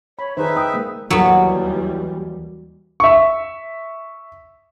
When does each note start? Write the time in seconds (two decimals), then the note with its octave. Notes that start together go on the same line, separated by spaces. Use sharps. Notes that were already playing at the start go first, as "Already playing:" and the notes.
0.19 C#5 B5
0.37 D#3 D#4 G#4 B4 C5 E5
0.57 G5 D#6
0.74 G#3 A#3
1.10 D#2 E3 F#3 G3 B3
3.00 E5 C#6